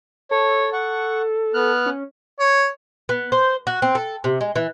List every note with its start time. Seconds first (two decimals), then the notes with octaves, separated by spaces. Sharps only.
0.31 A4 C#5
0.73 F#5 C#6
1.54 B3 F6 F#6
1.86 C#4
2.40 C#5
3.09 B3
3.32 C5
3.67 F#4
3.82 C4
3.95 A4
4.24 C3
4.41 G#3
4.56 E3